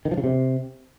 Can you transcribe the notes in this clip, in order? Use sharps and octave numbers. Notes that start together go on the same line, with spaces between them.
D#3
F3
C#3
C3